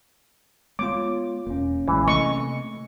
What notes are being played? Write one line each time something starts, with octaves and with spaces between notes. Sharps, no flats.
G#3 B3 F4 C#5 D6
E1 A#3 C#4
A#1 C#3 E3 G#3
C3 A3 D#5 C#6